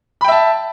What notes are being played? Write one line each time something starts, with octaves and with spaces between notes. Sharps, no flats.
E5 G5 A5 B5